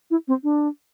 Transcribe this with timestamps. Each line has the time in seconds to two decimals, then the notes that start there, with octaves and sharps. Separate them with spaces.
0.10 E4
0.28 C4
0.43 D4